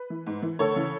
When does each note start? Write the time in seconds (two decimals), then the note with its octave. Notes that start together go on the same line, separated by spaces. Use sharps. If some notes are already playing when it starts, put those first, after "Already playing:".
Already playing: B4
0.10 E3
0.26 G#2
0.42 E3
0.59 D2 A4 C#5
0.76 C#3 E3